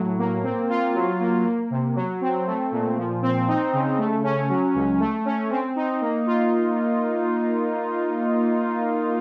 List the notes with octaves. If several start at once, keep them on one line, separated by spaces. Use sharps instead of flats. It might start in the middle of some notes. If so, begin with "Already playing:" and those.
Already playing: A2 F#3
A#3
C4
F4
F#3
A#3
A#3
C3
F#3
C4
A3
A#2
F3
C4
D#4
C#3
A3
C#4
F#3
C#2
A3
C#4
C4
D#4
A#3
F4